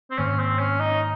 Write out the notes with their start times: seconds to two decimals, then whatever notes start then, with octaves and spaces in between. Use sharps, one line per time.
0.11 C4
0.18 G#2 D#3 A#3 C#4
0.39 C4
0.59 C#4
0.80 D#4